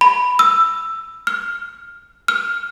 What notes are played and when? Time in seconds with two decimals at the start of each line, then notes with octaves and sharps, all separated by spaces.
0.01 B5
0.39 E6
1.27 F6
2.28 F6